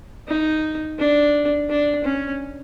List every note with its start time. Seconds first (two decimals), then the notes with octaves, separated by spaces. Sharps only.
0.28 D#4
0.99 D4
1.69 D4
2.05 C#4